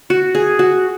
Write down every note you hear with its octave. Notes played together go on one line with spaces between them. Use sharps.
F#4
G#4
F#4